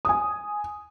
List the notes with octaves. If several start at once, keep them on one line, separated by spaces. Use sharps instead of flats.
G#5 D#6